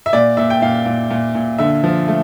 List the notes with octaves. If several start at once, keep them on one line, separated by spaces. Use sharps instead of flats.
E5
A#2 D5
A#2 E5
G5
A#2 F5
A#2
A#2
A#2
D3 E5
F3
A3